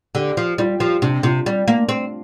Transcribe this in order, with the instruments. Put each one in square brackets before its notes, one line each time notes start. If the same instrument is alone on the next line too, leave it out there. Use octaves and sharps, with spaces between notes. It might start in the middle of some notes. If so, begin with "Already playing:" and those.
[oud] D3 [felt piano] G4
[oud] F3
[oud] G3 [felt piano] F4
[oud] F3 [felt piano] G4
[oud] C3 [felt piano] D4
[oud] C3 [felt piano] F4
[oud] G3
A#3
C4